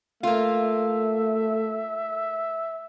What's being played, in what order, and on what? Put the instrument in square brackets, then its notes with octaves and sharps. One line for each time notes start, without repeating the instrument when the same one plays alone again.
[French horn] A3 [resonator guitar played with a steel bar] A#3 F4 [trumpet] E5